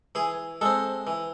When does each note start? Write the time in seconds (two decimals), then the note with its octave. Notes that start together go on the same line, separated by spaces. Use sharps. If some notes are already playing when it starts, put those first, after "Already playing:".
0.15 E3 G#4
0.61 G#3 C4 A4
1.07 E3